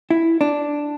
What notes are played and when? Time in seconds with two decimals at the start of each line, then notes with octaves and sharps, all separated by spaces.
0.10 E4
0.41 D4